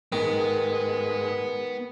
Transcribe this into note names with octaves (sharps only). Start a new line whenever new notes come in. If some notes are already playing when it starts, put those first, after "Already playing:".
G#2 D#3 G#3 B3